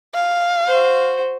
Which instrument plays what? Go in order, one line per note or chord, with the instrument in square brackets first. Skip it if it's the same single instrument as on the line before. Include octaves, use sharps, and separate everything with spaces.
[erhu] F5
[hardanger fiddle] F#4 C5